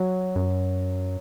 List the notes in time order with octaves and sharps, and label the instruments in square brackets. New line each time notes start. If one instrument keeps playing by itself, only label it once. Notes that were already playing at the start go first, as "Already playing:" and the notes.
Already playing: [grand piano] F#3
[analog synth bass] F#2